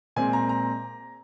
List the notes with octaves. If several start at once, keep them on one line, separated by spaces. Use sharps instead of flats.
A#2 G#3 C4 G#5
A#5
A#5